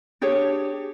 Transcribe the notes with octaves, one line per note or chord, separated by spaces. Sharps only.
D4 G4 G#4 C#5